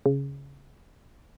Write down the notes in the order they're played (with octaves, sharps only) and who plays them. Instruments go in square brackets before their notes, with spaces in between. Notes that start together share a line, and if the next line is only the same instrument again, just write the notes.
[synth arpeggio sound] C#3